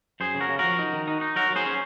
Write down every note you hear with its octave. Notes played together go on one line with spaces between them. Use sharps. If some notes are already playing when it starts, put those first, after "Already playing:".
F#2 G#4 C5
C#3
F#4 A#4
C#3
F3 F#4 A#4
D#4
D#3
D#4
D#4
F#3 F#4 A#4
F#3
G#4 C5
C#4